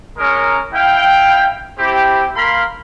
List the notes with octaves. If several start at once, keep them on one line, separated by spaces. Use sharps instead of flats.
G#3 C#4 A#4
E4 F5 G5
C4 E4 G4
A#3 A#4 F5 B5 C6